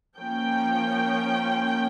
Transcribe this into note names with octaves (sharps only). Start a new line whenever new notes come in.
F3 A#3 C#4 G5